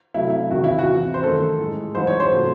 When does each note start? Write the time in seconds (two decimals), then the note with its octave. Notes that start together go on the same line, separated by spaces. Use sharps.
0.14 C3 F#3 A3 E4
0.30 E4
0.51 E2 C3 D#3 F#4
0.64 E4
0.79 F#4
0.87 E2 C3 E3
1.14 C5
1.23 F#2 D#3 A3 A4
1.59 A2 G#3
1.95 G#2 E3 G#3 C5
2.07 C#5
2.20 C5
2.32 C3 F#3 A3